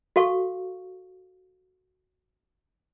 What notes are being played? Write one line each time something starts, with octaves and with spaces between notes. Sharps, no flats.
F#4 A4 F5 C#6